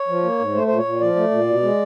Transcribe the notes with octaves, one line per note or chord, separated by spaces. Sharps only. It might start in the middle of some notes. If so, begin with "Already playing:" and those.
Already playing: C#5
F3
A#3
G#2
A3 C5
A#2 C5
C#5
A#2
F3 D5
A3
A#2
B2
G#3